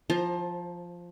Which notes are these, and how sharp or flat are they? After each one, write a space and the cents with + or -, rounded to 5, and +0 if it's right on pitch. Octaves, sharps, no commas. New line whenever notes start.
F3 +0 C5 +30 A#5 +0